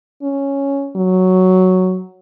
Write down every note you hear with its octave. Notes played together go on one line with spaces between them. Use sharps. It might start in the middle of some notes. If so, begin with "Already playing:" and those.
C#4
F#3